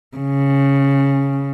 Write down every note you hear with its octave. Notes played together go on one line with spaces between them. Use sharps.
C#3